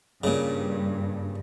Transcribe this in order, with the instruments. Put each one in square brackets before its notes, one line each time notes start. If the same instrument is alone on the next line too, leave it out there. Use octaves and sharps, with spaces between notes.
[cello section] G2 [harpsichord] A#2 C#3